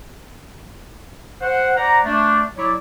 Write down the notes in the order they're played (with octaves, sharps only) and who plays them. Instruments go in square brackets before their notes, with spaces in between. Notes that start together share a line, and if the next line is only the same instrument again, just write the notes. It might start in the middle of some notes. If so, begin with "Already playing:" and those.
[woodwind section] C5 F#5
C5 D5 F#5 A#5
A3 D4
F#3 E4 C#5 D5